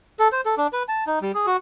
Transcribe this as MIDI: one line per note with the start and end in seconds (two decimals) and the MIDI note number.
0.19 0.28 69
0.32 0.41 72
0.46 0.55 69
0.57 0.67 62
0.73 0.83 71
0.88 1.04 81
1.07 1.19 63
1.22 1.32 55
1.34 1.46 68
1.46 1.57 66